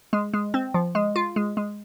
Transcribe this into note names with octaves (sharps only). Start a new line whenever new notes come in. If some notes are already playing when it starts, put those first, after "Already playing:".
G#3
G#3
C4
F3
G#3
F4
G#3
G#3